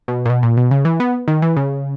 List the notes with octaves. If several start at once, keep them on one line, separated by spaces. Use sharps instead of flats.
B2
A#2
B2
A#2
B2
C#3
E3
B3
D#3
E3
C#3